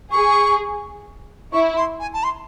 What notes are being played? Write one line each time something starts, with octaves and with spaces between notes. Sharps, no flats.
G#4 C#6
E4 C#6
C6
G#5
A5
C6